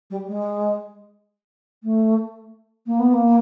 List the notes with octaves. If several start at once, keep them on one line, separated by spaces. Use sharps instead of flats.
G3
G#3
A3
A#3
B3
A#3